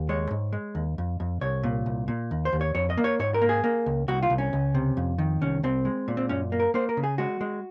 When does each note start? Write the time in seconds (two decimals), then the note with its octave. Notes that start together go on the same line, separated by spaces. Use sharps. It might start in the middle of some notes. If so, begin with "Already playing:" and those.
Already playing: D#2
0.09 G#3 C#5
0.31 G#2
0.53 G#3
0.75 D#2
0.98 F2
1.20 F2
1.41 C2 C#5
1.63 A#2
1.86 C2
2.08 A#2
2.31 D#2
2.45 C5
2.53 D#2
2.61 C#5
2.75 F2 C#5
2.90 D#5
2.97 A#3
3.04 C#5
3.19 G#2 C#5
3.34 A#4
3.42 A#3
3.49 G#4
3.64 A#3
3.86 C#2
4.08 C2 F#4
4.23 F4
4.30 C2
4.38 C#4
4.53 C#2
4.74 C3
4.97 F2
5.18 D#3
5.41 C2 C#4
5.63 C2 C4
5.85 G#3
6.08 A#2
6.17 C4
6.29 F#2 C#4
6.52 A#3
6.60 A#4
6.74 A#3 C5
6.89 A#4
6.97 C#3
7.04 G#4
7.18 G#3 F#4
7.41 G#3